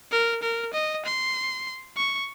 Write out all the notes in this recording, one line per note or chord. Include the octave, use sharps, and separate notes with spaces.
A#4
A#4
D#5
C6
C#6